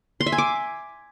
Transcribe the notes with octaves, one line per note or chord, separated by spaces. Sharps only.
C6
E5
G#5
D6